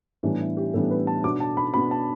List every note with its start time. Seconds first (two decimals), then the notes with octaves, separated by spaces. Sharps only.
0.23 A2 E3 G3 B3 D4 G4
0.40 E4
0.57 G4
0.74 A2 E3 G3 B3 D4 A4
0.91 B4
1.07 A5
1.24 B2 B3 D4 D6
1.40 A5
1.57 B5
1.74 B2 B3 D4 B5
1.91 A5